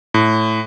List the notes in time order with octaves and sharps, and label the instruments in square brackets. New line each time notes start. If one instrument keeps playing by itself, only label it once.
[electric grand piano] A2